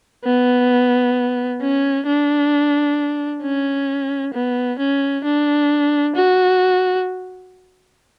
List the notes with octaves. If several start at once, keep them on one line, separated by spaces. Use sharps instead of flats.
B3
C#4
D4
C#4
B3
C#4
D4
F#4